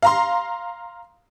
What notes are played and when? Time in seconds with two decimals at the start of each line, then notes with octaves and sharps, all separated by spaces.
0.02 F5 A#5 C6